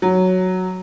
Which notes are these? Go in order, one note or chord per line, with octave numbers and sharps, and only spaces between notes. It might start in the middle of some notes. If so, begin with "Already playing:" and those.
F#3